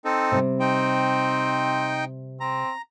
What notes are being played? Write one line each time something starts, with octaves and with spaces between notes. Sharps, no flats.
C4 D#4 A4
C3 G3
C4 D#4 G5
C4 A#5